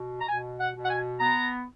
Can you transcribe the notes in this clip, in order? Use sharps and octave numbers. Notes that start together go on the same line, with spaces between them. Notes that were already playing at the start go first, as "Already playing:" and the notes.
Already playing: B2
A#5
B2 G#5
F#5
B2
F#5
G#5
B3 A#5